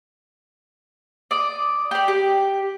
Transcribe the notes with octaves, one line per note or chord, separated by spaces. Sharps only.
D5 D#6
G4 D5
G4